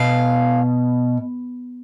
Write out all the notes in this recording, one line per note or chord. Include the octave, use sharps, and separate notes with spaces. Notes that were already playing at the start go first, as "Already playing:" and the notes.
Already playing: B2 F5